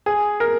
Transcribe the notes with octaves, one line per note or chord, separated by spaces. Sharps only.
G#4
A#4